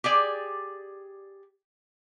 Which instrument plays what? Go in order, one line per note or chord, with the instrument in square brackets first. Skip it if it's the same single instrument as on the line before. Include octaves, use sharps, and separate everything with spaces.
[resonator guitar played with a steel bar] G4 G#4 D5